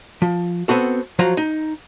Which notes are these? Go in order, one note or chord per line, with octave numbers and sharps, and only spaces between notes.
F3
B3 C4 F#4 A4
F3 F#3 C5 A#5
D#4